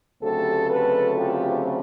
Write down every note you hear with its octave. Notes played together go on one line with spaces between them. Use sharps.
D2 C#3 F#3 A3 C4 G4 A4
A4 B4
F4 G4